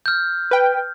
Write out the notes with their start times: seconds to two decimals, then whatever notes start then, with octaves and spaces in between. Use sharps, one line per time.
0.06 F6 G6
0.51 B4 G5